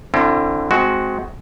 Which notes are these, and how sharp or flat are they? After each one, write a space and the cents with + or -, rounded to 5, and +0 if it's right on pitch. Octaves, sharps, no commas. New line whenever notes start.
D3 +20 C4 +30 E4 +45
G#3 +25 C4 -5 F#4 +0